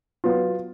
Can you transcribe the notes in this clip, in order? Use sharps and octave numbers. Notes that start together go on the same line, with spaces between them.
F#3 B3 F4